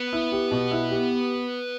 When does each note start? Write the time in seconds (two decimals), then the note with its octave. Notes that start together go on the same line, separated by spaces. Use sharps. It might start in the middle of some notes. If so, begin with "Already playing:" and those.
Already playing: B3
0.13 E4
0.32 G4
0.51 B2
0.71 E4
0.91 G4